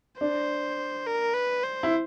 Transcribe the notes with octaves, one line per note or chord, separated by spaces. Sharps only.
D4 C5
A#4
B4
C5
E4